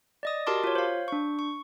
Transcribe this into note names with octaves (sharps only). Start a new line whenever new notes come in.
D5 D#5 D#6
F#4 G4 A#4 A5 C6 D6
F4 C#5
C5 F5
D4 C#6
C#6